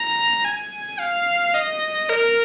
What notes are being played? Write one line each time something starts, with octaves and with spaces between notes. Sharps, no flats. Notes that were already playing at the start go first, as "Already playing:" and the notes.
Already playing: A#5
G#5
F5
D#5
A#4